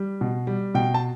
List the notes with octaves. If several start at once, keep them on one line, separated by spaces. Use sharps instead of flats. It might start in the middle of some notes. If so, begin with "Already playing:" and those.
Already playing: G3
B2
G3
B2 G5
A5